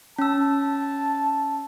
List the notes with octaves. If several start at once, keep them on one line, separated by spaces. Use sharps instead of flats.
C#4 A5 E6